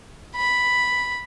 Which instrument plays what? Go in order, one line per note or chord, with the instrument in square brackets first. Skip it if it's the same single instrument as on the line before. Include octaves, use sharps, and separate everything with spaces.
[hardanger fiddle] B5